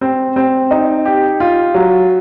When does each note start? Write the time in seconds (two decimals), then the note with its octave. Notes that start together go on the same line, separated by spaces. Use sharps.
0.01 C4
0.36 C4
0.71 D#4
1.05 G4
1.40 F4
1.74 F#3